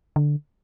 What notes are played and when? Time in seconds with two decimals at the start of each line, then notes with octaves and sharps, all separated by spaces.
0.16 D3